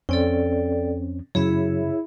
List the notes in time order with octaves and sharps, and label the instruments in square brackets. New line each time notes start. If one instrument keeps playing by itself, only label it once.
[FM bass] F2 [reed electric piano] C4 C#4 [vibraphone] A4 D5 G5
[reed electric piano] F#2 C#3 [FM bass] F#3 [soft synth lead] E4 [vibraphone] G#4 C#5 E5